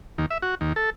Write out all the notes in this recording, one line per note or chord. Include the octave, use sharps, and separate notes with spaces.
D#2
E5
F#4
D#2
A4